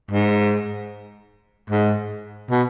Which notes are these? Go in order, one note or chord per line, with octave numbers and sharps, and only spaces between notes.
G#2
G#2
B2